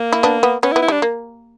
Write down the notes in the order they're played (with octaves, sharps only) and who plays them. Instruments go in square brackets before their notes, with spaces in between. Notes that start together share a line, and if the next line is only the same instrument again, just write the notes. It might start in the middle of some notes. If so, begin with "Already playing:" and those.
Already playing: [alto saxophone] A#3
[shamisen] E4
B3 D4
B3
[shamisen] B3 [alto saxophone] C#4
[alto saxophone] E4
[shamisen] B3
[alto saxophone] E4
[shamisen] G3 [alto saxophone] D4
[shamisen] A#3